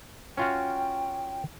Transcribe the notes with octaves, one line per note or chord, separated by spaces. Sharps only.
C#4 F4 F#4 G5